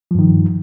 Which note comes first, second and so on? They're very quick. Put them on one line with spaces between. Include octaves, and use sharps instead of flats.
F3 G2 D#3